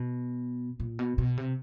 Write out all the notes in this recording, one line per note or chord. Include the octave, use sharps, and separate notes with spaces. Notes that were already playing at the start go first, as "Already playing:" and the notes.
Already playing: B2
A#2
B2
B2
C3